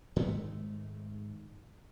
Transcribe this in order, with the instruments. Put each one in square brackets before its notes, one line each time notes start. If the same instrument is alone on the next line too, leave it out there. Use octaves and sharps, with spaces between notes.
[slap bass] G#2 D#3 G#3 A3